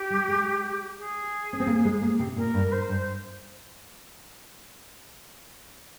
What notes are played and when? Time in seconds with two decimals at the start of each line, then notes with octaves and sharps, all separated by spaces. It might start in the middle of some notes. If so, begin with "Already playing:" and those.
Already playing: G4
0.10 G3
0.28 G#3
0.98 G#4
1.53 C#4
1.60 C4
1.67 A#3
1.85 G#3
2.02 A#3
2.19 C3
2.36 A#2 A#4
2.54 G2
2.67 A#4
2.72 C5
2.89 G2